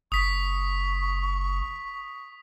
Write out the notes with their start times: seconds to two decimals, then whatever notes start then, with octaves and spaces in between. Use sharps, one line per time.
0.12 F#1 C#6 D#6 B6